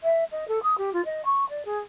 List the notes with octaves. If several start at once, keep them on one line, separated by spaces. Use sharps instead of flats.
E5
D#5
A4
D#6
G4
F4
D#5
C#6
D5
G#4